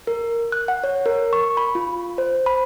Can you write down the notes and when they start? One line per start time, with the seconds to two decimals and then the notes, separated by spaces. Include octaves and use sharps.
0.07 A#4
0.52 F#6
0.68 F#5
0.84 C#5
1.06 A#4
1.33 C#6
1.57 B5
1.75 F4
2.18 C5
2.46 B5